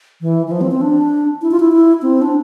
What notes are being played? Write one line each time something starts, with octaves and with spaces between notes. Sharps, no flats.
E3
E3
F3
C4
C4
D4
E4
F4
E4
E4
C4
D4